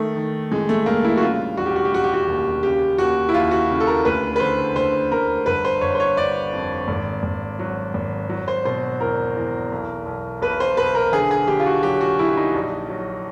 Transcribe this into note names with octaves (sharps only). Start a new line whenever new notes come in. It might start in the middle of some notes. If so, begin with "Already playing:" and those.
Already playing: D#3 A3
D#3
A1 G#3
A3
G2 A#3
E4
F#4
C#3 F4
E1 F#4
G4
F#4
G4
E1 F#4
G4
F#4
D#2
C#3 G4
D#2 F#4
E4
D#2 F4
F#4
C#3
A4
A#4
D2 B4
B4
D3 C5
D2 C5
D2 A#4
G1 B4
C5
G1 C#5
C5
C#5
G1 D5
F2
G#1
G#1
F#3
G#1
F#3
C5
B2 C5
E2 A#4
E2
B1
B1
B1 B4
C5
B1 B4
A#4
D3 G#4
G#4
D3 G4
F4
F#4
F#3 G4
F#4
F#3 E4
D#4
A#1
F#3